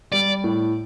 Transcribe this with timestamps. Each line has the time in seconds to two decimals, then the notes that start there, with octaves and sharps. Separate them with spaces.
0.12 G3 D5
0.44 A2